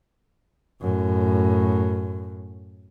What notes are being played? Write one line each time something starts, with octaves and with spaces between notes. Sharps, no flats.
F#2 A2